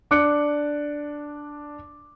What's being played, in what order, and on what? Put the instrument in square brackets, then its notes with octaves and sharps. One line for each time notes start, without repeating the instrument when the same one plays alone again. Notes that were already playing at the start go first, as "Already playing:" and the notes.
[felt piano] D4 D6 F#6 C#7